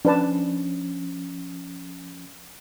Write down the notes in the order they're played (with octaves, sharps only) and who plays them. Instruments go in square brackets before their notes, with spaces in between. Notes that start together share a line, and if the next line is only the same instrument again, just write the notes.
[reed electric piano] F3 C#4 [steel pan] D4 B4 A5